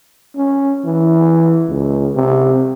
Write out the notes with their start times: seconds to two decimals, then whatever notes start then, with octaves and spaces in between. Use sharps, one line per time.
0.36 C#4
0.85 E3
1.68 C#2
2.15 C3